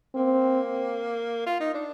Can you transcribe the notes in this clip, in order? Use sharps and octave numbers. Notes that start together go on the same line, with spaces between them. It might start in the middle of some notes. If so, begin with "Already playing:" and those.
A#3 C4
F4
D#4
D4